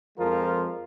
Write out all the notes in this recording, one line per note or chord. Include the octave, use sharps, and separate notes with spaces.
F2 F3 G#3 F4 A#4